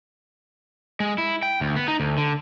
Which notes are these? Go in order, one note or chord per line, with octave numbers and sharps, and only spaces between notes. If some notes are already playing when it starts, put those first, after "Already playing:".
G#3
E4
G5
D2
B3
D#4
D2
D3